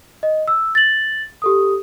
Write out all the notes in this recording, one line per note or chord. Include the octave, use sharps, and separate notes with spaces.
D#5
E6
A6 F#7
G4 A4 D#6